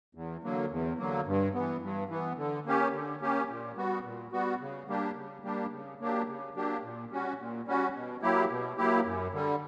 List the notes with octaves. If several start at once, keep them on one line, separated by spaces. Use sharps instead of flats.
E2
D3 F#3 A#3
E2
D3 F#3 A#3
G2
E3 B3
G2
E3 B3
D3
A#3 C#4 G4
D3
A#3 C#4 G4
A#2
G3 B3 F#4
A#2
G3 B3 F#4
C#3
G3 A#3 D4 G4
C#3
G3 A#3 D4 G4
C#3
F#3 A#3 D4 G4
C#3
F#3 A#3 D4 G4
A#2
G3 C#4 F#4
A#2
G3 C#4 F#4
B2
F#3 A#3 E4 G4
B2
F#3 A#3 E4 G4
F#2
D3 G3